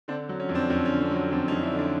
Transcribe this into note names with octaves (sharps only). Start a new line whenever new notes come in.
D3 C4 D4
F#3
C#4
F2
C4 D4
F2 C#4
C#4
D3
C4 D4
F#3
C#4
F2 C4 D4
C#4 D#4
F2
D4 E4
D3 D4 E4